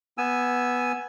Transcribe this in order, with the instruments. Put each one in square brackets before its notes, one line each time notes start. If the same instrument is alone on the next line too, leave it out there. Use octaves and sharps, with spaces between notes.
[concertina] B3 G#5 E6